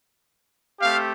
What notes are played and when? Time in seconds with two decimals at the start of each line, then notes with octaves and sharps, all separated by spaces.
0.81 A3 C4 G4 F5